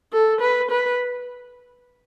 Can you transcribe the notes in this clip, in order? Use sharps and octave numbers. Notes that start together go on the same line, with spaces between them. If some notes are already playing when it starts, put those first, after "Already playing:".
A4
B4
B4